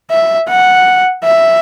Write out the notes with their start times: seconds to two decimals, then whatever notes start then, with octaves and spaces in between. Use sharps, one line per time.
0.10 E5
0.48 F#5
1.24 E5